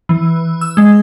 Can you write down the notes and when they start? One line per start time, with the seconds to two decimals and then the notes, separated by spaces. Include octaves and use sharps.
0.09 E3
0.61 E6
0.77 G#3